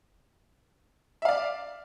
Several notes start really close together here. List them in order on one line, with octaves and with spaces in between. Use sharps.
E5 F5 D5